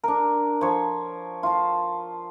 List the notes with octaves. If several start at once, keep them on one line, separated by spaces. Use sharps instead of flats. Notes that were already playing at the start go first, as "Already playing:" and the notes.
D4 A#4
F3 C#5
F4 A5